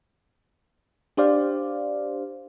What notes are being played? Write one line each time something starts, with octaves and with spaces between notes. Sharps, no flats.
D4 G4 C5 D5 F5